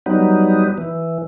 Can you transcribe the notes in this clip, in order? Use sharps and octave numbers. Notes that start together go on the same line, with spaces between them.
F#3 G3 B3 D#4
E3